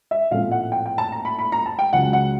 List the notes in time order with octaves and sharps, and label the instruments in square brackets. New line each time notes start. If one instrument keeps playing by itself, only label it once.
[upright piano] E5
A#1 A2 F3 A3 C4 F5
F#5
G5
G5
A5
A#5
B5
B5
A#5
A5
G5
C#2 C#3 F#3 F#5
F#5